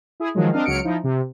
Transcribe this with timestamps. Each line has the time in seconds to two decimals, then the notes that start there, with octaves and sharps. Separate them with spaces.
0.20 E4 G#4
0.35 D#3 F3 F#3 G#3
0.52 C4 D4 A#4 D#5 F5
0.65 C#2 F#3 F6 C#7 D7
0.84 F3 D#4 E4
1.04 C3